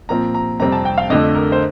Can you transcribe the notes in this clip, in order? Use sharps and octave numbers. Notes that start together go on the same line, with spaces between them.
A#2 F3 C4 A#5
A#5
F2 C3 G3 C4 A#5
A5
G5
F5
F2 D3 A3 D#5
A#4
C5